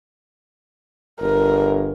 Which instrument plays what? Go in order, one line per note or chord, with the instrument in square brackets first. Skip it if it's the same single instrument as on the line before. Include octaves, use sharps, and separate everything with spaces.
[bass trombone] G1 [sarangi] A#4